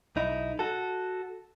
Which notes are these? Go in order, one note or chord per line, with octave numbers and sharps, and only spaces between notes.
B1 D#4 E4
F#4 A4